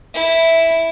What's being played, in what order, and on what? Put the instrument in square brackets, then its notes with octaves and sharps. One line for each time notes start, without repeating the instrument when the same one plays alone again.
[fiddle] E4